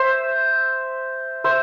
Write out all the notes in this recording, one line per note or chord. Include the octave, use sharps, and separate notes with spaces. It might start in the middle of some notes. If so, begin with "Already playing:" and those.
Already playing: C5 E5
C5 E5